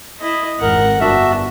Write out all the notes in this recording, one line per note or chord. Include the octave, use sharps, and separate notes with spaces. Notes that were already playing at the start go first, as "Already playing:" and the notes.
E4 D#5
G#1 F2 A#4 F#5
G1 D4 F#4 E5